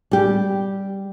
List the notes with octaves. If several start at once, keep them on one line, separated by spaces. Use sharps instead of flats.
G3 G4